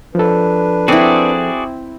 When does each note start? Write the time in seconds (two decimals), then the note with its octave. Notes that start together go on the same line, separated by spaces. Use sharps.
0.15 F3 D4 A4 B4
0.88 C4 E4 F#4 G#4 D5